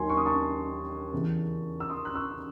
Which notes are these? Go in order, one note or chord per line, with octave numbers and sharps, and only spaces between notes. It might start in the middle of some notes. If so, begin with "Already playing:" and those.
Already playing: D#2 D#3 F#3 G#5 C6
C#6
D#6
A5 C#6
E2 C#3 E3
E6
C6 D#6
F#6
C#6 E6